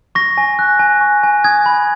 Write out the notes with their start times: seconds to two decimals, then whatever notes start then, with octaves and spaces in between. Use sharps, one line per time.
0.15 C#6 A#6
0.38 G#5
0.59 F#6
0.79 G#5
1.01 C#6
1.23 G#5
1.44 D#6 G#6
1.66 B5